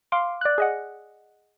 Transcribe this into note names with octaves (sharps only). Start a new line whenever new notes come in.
F5 C6 D6
D5 F#6
G#4 D#5 F#5